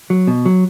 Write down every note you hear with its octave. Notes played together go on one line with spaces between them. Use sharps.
F#3
B2
F#3